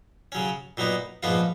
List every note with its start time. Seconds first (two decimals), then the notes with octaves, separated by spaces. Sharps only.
0.32 C#3 F#3 C#4
0.77 A#2 F#3 B3 D#4
1.23 A#1 G#2 F3 B3 F4